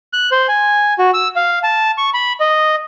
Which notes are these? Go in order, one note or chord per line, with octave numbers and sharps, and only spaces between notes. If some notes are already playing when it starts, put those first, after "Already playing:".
F#6
C5
G#5
F#4
E6
F5
A5
C#6
B5
D#5